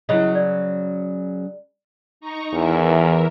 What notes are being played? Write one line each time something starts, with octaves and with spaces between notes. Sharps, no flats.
C#3 F#3 E4 D#5
D5
D#4 A#5 C#6
E2 E3 A#4 E5